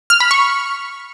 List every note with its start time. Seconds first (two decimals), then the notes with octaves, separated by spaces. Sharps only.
0.10 F6
0.20 B5
0.31 C#6